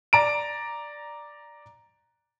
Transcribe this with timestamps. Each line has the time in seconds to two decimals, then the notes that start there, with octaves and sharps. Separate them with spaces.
0.13 D5 A#5 D7